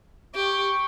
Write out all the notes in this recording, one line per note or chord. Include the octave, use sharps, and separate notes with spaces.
G4 C#6